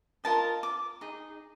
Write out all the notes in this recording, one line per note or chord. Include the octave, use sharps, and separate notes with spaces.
F4 A#4 D#5 A5
D6
D#4 G#4